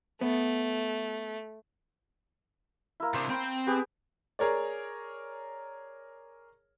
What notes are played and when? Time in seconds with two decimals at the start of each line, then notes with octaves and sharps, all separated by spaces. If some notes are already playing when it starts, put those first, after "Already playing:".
0.21 A3 B3
3.00 A#3 E4
3.14 C3 D4 C5 D#6
3.30 C4 G5 B5
3.67 B3 G4 G#4
4.39 G#4 A#4 C#5 D5